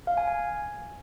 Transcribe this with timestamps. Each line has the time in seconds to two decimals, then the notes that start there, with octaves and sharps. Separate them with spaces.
0.07 F5
0.17 G#5
0.27 G#5